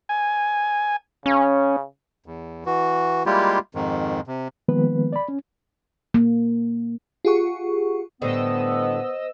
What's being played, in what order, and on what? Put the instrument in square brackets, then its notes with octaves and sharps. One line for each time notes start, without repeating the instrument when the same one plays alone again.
[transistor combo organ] G#5
[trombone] C#3 [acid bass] C#4
[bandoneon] E2
E3 F#4
G3 G#3 A#3 E4 F4 G4
F2 G#2 D#3
C3
[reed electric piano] D#3 F3 G#3 A#3 B3 B4
D5 B5
C#4
[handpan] A#3
[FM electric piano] F4 G4 G#4 F#5 C#6
[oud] A2 D3 G3 [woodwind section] B3 [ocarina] C5 [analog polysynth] D#5 E6